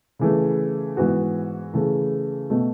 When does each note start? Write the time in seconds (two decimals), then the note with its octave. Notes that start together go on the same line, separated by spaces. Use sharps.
0.19 C#3 E3 A3
0.97 G#2 E3 B3 F#4
1.73 C#3 E3 A3
2.50 B2 A3